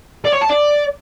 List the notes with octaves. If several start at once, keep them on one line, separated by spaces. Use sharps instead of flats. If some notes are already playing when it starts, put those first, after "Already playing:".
D5
C#5
A5
D5